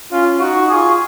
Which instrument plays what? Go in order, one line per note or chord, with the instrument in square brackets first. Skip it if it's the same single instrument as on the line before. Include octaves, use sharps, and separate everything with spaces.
[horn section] C#4 F4
[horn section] D#4 F#4 [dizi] C#6
[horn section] F4 G#4 [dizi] C#6 D#6